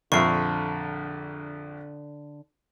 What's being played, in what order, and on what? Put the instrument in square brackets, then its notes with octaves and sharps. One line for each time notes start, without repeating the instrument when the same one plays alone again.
[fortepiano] A#1 F2 E5 [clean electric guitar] D3 [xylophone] C#6 C7